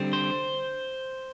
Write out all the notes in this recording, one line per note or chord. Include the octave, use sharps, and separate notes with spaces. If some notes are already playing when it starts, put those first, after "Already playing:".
Already playing: D3 G3 C4
C5